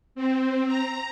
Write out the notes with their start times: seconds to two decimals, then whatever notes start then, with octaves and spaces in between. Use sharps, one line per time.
0.15 C4
0.67 A#5